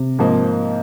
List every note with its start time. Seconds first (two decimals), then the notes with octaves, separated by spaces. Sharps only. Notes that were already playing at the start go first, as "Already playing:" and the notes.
Already playing: C3
0.19 G#2 F3 A#3